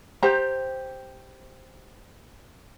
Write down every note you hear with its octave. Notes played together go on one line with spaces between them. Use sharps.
G4 C5 A#5